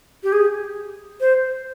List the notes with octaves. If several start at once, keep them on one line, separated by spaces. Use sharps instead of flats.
G4
G#4
C5